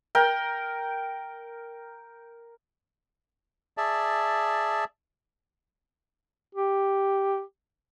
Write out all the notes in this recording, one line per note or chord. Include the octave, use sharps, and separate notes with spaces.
A#4 G5
G#4 D5 E5 A5
G4